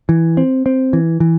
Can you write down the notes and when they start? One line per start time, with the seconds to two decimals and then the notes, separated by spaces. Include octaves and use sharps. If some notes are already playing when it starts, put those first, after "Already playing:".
0.09 E3
0.37 C4
0.66 C4
0.93 E3
1.20 E3